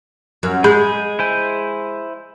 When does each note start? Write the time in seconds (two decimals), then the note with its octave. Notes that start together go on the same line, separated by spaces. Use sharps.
0.43 F#2
0.64 G#3 G#4 B5 G6
1.19 E4 C5 G#5